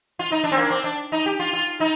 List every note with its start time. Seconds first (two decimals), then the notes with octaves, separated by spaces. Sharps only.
0.19 F4
0.31 D#4
0.44 D4
0.52 C4
0.57 A#3
0.65 D4
0.70 C4
0.84 D4
1.12 D#4
1.26 G4
1.39 F4
1.53 F4
1.80 D#4